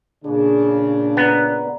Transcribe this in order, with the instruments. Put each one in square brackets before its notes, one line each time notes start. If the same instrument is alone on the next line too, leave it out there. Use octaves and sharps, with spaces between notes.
[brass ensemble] A#2 C#3 D4 [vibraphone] G#4
[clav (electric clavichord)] B3 [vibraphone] D5 A#5